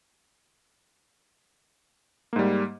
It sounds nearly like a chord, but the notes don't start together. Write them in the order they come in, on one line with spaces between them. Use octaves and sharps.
A#3 G#2 G3